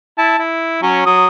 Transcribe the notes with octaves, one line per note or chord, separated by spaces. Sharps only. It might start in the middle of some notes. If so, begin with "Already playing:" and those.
E4 A5
E4
F#3 C#4
F#3 D#6